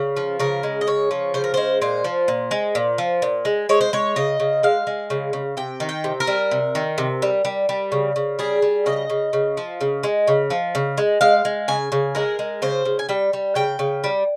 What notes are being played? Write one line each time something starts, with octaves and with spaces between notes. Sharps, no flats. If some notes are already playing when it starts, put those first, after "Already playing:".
Already playing: C#3
F3
C#3 A#4
G#3
D#5
C#3 C#5
F3
C#3 C5
A#4
G#3 C5
A#2 C5
F3
A#2
G#3
A#2
F3
A#2
G#3
G#3 C#5
C5
G#3 C#5
C#3 D#5
C#3
G#3 F5
G#3
C#3
C#3
C3 G5
D#3
G5
C3
A#4
G3
C3
D#3
C3
G3
G3
G3
C#3
C#3
G3 G#4
G3
C#3 D#5
C#3
C#3
F3
C#3
G#3
C#3
F3
C#3
G#3
G#3 F5
G#3
C#3 G#5
C#3
G#3 A#4
G#3
C#3 C5
C#3
G#5
G3 G5
G3
C#3 G5
C#3
G3